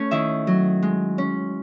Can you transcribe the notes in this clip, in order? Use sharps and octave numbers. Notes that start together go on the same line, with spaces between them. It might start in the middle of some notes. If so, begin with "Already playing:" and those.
Already playing: A3 C#4 C#5
D#3 E4 E5
F#3
G#3
C#4